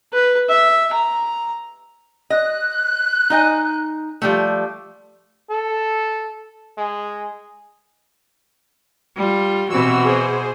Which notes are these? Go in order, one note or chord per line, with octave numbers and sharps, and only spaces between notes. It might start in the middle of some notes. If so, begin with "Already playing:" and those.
B4
E5
A#5
D#5 F#6
D#4 D#5 G#5
F3 G3 A3
A4
G#3
G3 F4
B2 E3 C4 F#4 E6
G#4 C5